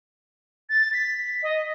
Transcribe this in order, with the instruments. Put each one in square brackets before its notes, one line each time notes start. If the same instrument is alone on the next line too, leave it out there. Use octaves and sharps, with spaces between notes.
[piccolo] A6
B6
D#5